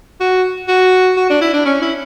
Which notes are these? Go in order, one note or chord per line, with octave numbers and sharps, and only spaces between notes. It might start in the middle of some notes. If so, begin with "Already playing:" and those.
F#4
F#4
F#4
D4
E4
D4
C#4
E4